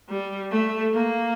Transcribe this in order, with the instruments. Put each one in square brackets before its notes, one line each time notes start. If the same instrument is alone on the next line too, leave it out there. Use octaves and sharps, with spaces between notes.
[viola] G3
A3
A#3